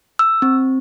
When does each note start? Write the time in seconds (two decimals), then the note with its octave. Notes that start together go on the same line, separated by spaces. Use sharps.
0.19 E6
0.42 C4